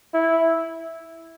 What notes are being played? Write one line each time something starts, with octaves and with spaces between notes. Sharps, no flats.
E4